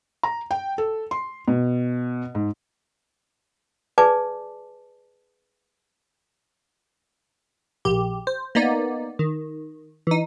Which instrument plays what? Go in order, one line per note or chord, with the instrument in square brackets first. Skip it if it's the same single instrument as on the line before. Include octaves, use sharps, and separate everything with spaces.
[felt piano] A#5
G5
A4
C6
B2
G#2
[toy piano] G#4 B4 D5 G#5 A5 D6
[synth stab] A#1 G4
C5
A#3 B3 D#4 D5
D#3
E3 D#4